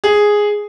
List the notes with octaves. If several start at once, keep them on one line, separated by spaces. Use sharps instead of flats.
G#4